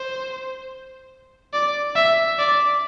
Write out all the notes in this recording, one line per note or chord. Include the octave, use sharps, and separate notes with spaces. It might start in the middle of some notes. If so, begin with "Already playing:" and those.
Already playing: C5
D5
E5
D5